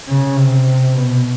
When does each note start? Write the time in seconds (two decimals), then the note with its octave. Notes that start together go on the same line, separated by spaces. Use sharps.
0.08 C#3
0.37 C3
0.94 B2